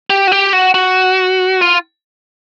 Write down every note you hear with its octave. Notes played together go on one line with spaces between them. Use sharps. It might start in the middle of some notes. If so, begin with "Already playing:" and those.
G4
F#4
G4
F#4
F#4
F4